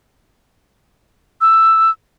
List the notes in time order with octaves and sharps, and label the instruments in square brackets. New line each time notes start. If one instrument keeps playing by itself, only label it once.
[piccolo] E6